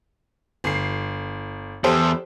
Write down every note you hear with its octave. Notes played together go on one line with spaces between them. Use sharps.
G1 C7
E2 G4 A4 C5